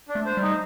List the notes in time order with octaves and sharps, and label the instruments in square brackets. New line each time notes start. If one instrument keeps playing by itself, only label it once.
[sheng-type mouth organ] D4
[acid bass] A3
[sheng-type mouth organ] C5
[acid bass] G3 [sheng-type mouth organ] D#4